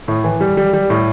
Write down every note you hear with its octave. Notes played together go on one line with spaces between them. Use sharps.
A2
E3
G3
G3
G3
A2